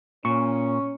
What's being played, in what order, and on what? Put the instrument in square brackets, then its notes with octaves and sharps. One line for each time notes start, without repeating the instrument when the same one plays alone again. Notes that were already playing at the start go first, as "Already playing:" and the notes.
[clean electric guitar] A#2 [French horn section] C#4 [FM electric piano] C#6